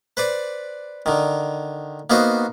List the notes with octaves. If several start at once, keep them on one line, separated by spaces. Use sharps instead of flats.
B4 C5 D5
D3 D#3
A#3 B3 D#4 F#4 C5